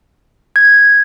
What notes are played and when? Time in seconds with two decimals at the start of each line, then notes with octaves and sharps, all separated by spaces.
0.56 G#6